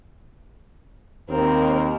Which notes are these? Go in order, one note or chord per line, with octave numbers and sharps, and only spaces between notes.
D#2 C4 A#4